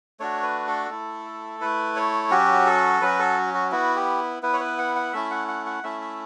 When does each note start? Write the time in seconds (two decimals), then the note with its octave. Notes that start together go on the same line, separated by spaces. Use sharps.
0.20 A3 D4 F#4 C#5
0.43 B4
0.67 A4
0.90 A3 E4
1.61 A3 E4 B4
1.96 C#5
2.31 F#3 C#4 F#4 G4
2.67 A4
3.01 F#3 C#4 F#4 B4
3.19 A4
3.54 F#4
3.72 B3 E4 F#4
3.96 G4
4.43 B3 E4 B4
4.53 C#5
4.60 B4
4.78 F#5
4.96 F#5
5.13 A3 C#4 E4 E5
5.31 F#5
5.48 F#5
5.66 F#5
5.83 A3 C#4 E4 E5
6.01 E5